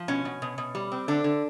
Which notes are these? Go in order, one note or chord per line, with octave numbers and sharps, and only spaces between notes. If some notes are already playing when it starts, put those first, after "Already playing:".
Already playing: F3
B2 C#4
B2
B2
B2
G3
C4
D3 D4
D3